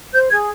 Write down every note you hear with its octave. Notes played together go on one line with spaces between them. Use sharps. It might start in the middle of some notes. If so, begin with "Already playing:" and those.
C5 G6
G#4 G#6